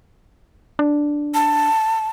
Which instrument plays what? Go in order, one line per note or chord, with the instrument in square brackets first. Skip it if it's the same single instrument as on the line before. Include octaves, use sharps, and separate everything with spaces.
[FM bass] D4
[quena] A5